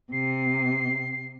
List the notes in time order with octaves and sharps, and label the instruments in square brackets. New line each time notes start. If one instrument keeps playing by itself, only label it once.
[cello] C3 [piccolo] C7